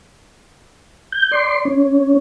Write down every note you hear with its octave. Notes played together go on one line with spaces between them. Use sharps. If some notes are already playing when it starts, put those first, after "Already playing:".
G6
D5 C6
C#4